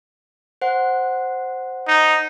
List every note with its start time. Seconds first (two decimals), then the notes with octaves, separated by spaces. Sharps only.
0.62 C5 F#5
1.88 D#4